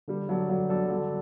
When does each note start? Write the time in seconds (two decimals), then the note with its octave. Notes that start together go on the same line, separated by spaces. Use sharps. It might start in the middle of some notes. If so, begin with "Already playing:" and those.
0.08 D3 G3
0.28 F#3 G3 D4 A4 D5
0.49 D3 F#3
0.69 F#3 G3 D4 A4 D5
0.89 D3 F#3